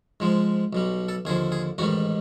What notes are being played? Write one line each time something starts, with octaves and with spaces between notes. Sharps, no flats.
G#2 F3 G#3
B1 B2 G3
A4
D#2 D3 F3 G#4
G#4
A1 G#2 D#3 G3 F#4